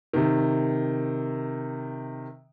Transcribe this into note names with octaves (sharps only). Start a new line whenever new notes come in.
C3 D#3